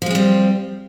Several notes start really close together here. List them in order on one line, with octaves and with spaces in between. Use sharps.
F3 G#3 C4 G3